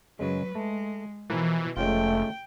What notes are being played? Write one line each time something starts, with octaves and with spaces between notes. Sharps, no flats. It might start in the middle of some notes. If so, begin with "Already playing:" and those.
F#2 C#3 F#3 G#3 B4
G#3 A3
B2 E3 F3 A#4 B4
F1 G#3 A3 C#4 F4 G5